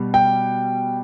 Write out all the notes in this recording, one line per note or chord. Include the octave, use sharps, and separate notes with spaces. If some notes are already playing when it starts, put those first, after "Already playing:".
Already playing: B2 G3
G5